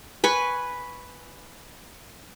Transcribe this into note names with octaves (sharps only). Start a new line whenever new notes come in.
B4 G#5 C#6